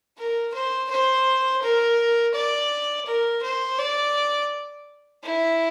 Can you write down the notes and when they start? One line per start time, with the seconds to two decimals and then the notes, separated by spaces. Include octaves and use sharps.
0.18 A#4
0.54 C5
0.90 C5
1.62 A#4
2.34 D5
3.06 A#4
3.43 C5
3.78 D5
5.23 E4